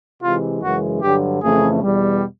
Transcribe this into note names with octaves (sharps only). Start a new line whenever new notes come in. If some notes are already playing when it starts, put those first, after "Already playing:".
C3 E3 G#3 F4
F#2 C#3 E3 G#3 F#4
G2 D3 F#3 G4
F2 C#3 E3 A3 G#4
E2 B2 G3